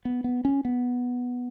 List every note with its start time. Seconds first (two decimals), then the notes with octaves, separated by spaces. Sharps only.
0.05 B3
0.24 B3
0.45 C#4
0.65 B3